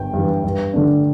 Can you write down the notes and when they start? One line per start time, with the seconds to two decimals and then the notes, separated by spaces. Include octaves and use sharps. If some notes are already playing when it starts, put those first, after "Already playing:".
Already playing: G1 G5
0.13 G2 E3
0.44 G2
0.74 D3 A3 D4